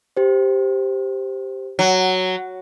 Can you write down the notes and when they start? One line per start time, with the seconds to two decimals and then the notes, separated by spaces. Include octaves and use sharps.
0.17 G4 C5
1.79 F#3